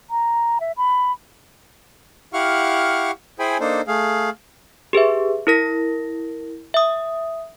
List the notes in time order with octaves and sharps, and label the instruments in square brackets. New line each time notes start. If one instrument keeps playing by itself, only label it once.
[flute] A#5
E5
B5
[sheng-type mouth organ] E4 G4 F5 F#5 C#6 F6
E4 G#4 C5 G5 G#5 B5
A#3 D4 D#4 A4 C5
A3 G#4 F5
[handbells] G4 G#4 B4 E5
E4 A#4 A#6
E5 D#6